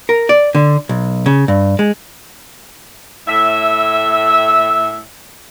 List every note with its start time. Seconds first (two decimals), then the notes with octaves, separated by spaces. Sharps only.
0.09 A#4
0.29 D5
0.55 D3
0.89 B1
1.26 C#3
1.48 G2
1.79 G#3
3.28 A2 E5